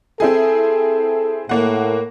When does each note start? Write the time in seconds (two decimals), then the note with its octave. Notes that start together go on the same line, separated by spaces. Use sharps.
0.20 C4 E4 G#4 A4
1.49 A2 A#3 F#5